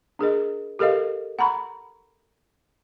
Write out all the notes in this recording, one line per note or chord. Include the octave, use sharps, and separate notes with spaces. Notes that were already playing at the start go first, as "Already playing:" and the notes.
D4 G#4 A#4 D#5
G4 A4 A#4 D#5 F5
F#5 A#5 B5 C#6